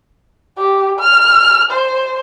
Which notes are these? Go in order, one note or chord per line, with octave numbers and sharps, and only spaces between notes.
G4
F6
C5